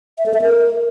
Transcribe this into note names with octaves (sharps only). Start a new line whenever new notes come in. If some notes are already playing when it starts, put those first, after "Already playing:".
E5
A4
E5
A#4